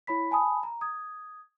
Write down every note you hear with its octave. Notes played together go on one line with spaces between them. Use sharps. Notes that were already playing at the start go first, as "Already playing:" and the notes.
E4 C#5 B5 B6
G#5 A5 B5 D#6
A#5
D#6 G#6